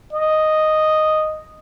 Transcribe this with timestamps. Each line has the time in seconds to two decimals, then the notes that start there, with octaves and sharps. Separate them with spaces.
0.13 D#5